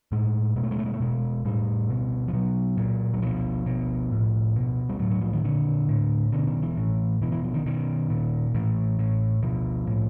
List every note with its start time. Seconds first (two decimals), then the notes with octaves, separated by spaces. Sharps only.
0.12 A2 G#3
0.56 B2 G#3
0.63 A3
0.71 G#3
0.79 A3
0.86 G#3
0.93 A3
1.00 B2 G#3
1.45 A2 G3
1.89 B2
2.28 F3
2.33 B2 F#3
2.78 A#2
3.14 F#3
3.22 B2 F3
3.66 B2
4.12 A2
4.55 B2
4.89 G3
4.99 A2 F#3
5.11 F#3
5.21 F3
5.33 D#3
5.44 A#2 D3
5.89 A2
6.32 B2 D3
6.47 D#3
6.62 E3
6.77 A2
7.22 B2 E3
7.32 E3
7.44 F3
7.54 D#3
7.66 B2 D#3
8.10 A#2
8.54 A2 E3
8.99 A2
9.42 B2 F3
9.87 A2